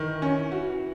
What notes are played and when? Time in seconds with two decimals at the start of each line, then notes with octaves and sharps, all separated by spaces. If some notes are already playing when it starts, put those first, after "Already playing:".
Already playing: D#3 E3
0.22 C#4
0.52 F#4